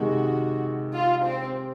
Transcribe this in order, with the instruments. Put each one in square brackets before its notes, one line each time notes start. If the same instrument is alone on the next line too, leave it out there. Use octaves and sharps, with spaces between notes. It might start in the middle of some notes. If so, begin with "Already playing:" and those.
Already playing: [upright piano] C3 D#3 G#3 D#4 [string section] F#4
[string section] F4
C4